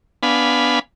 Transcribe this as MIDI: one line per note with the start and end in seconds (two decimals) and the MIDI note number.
0.23 0.79 59
0.23 0.79 62
0.23 0.79 77
0.23 0.79 80
0.23 0.79 83